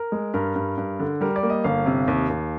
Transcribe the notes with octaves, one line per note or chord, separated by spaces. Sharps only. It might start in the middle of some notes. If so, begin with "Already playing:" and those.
Already playing: A#4
G#3
G2 A#4
G2
G2
D3
G3 A#4
D5
A#3
D#5
G1 F5
C3
D#2
D#2